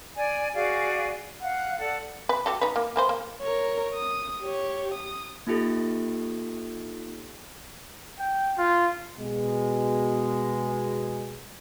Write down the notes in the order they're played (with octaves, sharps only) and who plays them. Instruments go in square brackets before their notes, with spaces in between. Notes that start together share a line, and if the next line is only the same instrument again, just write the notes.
[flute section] D5 G#5
F#4 G#4 D5 F5
F5 F#5
A4 D5 F#5 A5
[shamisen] B4
F#4 G4 A4
D#4 B4
A#3
A#3 B4 C5
A#3
[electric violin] A#4 C#5
D#6
G4 C#5
D#6
[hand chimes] A#3 D#4 F4 G4 A4
[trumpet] G5
F4
[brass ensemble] B2 G#3